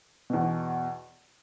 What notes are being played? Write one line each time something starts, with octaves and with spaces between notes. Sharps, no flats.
E2 B2